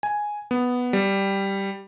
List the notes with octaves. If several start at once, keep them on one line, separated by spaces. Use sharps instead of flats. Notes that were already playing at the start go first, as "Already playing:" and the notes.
G#5
B3
G3